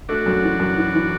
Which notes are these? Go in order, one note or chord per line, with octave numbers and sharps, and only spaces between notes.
A3 D4 F#4
F#2
E3
F#2
E3
E3